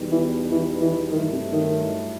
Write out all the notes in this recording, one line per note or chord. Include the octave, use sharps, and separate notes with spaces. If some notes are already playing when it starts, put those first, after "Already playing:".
Already playing: E2 B2 G3 D#4
E3
E3
E3
G2 D#3 F#3 A3 E4
C3
D#3